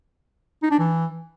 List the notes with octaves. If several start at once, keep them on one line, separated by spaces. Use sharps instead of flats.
D#4
D4
E3